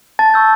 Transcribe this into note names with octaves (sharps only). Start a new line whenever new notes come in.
A5 A6
C#6 E6 G6